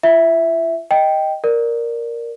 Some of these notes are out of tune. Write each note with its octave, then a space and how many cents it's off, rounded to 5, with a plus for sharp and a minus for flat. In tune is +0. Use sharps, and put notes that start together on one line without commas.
F4 -45 E5 +0
D#5 +0 G5 +0
A#4 +0 D5 +5